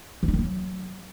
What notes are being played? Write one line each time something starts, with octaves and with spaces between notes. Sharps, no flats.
E3
D#4
D#3
A#3
F#3